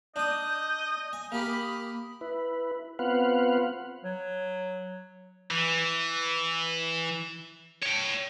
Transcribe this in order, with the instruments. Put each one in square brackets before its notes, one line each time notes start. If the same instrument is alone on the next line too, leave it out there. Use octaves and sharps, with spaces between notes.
[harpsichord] D4 D#6 [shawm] D#5 [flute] G6
[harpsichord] G#5 [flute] D#6
[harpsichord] A#3 G4 A#4 [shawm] B5
[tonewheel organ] E4 B4
B3 C4 F4 B4 F5 F#5
[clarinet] F#3
[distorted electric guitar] E3
C#5 G5